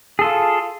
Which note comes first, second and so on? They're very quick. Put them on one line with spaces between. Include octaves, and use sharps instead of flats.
G#4 A4 F4